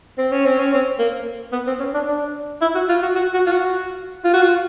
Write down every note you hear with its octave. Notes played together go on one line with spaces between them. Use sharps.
C4
C#4
C4
C#4
C4
A#3
B3
C4
C#4
D4
D4
E4
F#4
F4
F#4
F#4
F#4
F4
F#4
F4
F#4
F4